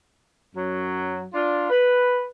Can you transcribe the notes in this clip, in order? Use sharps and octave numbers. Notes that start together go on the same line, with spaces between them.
F#2 F#3
D4 F4
B4